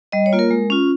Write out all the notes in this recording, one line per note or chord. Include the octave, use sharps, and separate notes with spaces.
G3 D#5
C#5
A#3 F4
A#4
G#3
C#4 F4